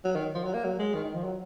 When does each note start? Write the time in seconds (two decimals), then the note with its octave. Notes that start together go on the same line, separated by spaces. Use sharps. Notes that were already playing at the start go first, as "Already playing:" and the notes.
0.05 F#3
0.15 D#3
0.35 F3
0.45 F#3
0.54 A#3
0.64 F#3
0.79 G#3
0.94 D#3
1.05 D#3
1.14 F3
1.24 F#3